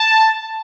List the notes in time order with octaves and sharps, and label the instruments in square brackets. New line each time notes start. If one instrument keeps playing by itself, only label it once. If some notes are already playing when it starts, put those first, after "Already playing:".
Already playing: [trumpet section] A5